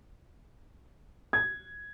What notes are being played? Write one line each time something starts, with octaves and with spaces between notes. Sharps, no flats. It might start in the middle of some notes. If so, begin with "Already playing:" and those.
G#6